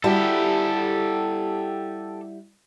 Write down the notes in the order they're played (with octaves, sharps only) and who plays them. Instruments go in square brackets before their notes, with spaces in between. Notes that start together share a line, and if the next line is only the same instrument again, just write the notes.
[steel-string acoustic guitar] G3 E4 F#4 [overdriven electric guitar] G4 A4